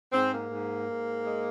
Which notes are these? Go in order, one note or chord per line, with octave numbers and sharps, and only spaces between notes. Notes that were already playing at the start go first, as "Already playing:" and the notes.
G#2 C4
A#3
G#2
G#2
G#3